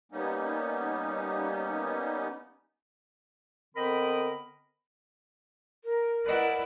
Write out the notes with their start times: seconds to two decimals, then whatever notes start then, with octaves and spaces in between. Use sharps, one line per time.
0.12 G3 A#3 B3 C#4 D#4
3.75 D3 B3 C4 A#4 D#5 B5
5.84 A#4
6.26 E4 B4 D5 D#5 F#5